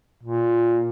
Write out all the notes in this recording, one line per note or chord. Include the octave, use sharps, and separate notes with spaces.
A#2